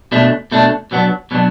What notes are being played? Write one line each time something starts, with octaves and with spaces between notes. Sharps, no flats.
B2 A3 D4
B2 A3 D4
B2 F#3 B3 D4
B2 F#3 B3 D4